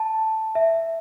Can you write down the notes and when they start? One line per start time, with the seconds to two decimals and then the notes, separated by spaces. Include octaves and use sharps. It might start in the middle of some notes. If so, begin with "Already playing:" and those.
Already playing: A5
0.55 E5